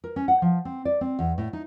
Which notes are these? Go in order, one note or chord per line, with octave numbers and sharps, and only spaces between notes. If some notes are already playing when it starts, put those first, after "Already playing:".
A#4
C#4
F#5
F3
C4
D5
C4
E2
A2
D#4